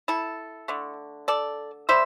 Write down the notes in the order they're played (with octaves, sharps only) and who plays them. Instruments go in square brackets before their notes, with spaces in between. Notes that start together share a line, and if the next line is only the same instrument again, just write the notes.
[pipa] E4 A4
D3 A3
A4 D5
G3 C5 E5